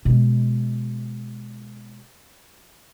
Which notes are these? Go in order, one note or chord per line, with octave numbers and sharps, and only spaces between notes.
B2 G#3